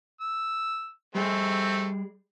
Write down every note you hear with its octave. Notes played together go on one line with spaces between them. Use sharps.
E6
G3 A3 C4 G#4